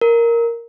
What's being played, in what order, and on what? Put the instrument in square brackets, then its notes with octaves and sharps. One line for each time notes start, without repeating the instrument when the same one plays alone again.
[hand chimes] A#4